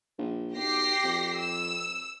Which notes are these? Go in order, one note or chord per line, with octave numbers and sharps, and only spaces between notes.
A#1
B1 G4 A#6 C7
F2
E6